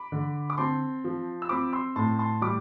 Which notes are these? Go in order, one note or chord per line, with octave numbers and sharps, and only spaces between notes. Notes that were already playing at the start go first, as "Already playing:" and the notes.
Already playing: B5 D6
D3
D6
C4 A5 C6
F3
E6
C4 B5 D6
C6 E6
A2 A5 C6
A5 C6
G3 B5 D6